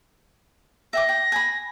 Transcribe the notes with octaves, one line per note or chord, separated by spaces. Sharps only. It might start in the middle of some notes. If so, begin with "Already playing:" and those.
E5 G5 D6 A#6
G5
G#5 B5